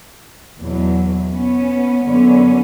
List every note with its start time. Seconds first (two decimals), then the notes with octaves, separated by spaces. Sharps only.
0.58 E2 B2 F#3
1.30 B3 C#4
2.03 F#2 D3 F#3 B3 C#4